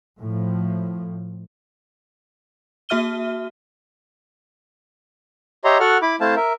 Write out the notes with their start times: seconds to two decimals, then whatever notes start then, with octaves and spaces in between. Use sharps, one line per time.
0.21 A2 F3
2.89 A#3 F#4 E5 F6 D#7 G7
5.65 G4 C#5 D#5 E5 A#5 C6
5.80 F#4 A4 F#5 F6
6.02 E4 B5 D6
6.21 A3 C4 E4 C5 F5 A5
6.36 A#4 E5